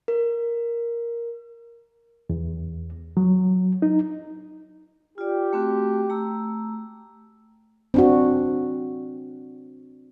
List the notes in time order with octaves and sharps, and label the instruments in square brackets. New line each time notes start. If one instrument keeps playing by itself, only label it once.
[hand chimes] A#4
[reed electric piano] E2
F#3
D#4
[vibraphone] F4 D5 [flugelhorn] G4
[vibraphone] A3 C4 F#4
A3 A#5 E6
[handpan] C4 D4 F#4